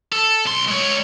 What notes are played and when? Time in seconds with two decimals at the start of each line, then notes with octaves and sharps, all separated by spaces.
0.12 A4
0.45 B1 C6
0.69 G#3 C#5